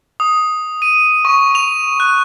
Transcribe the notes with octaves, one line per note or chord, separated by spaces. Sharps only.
D#6
D#7
C#6
F7
F#6